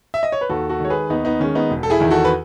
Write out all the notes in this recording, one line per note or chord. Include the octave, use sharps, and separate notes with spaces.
E5
D#5
C#5
B4
D#2 F#4 A4
F#4 A4
D#3 G#3 C#5
G#4 B4
D#2 B3 D#4
B3 D#4
D#3 G#3 C#4
B3 D#4
E1
A4
E4 G#4
E2 D#3
F#4 A4
B4